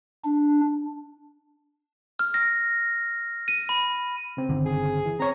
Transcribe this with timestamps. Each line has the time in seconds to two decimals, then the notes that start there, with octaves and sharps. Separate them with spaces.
0.24 D4
2.19 F6
2.34 A#6
3.48 D#7
3.69 B5
4.37 C#3 C4
4.49 G1 D3 D#3
4.66 G#4
5.06 E3
5.20 C4 C#5 A#5